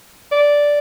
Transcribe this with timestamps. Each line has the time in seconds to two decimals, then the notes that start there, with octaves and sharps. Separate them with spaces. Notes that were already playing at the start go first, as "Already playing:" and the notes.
0.31 D5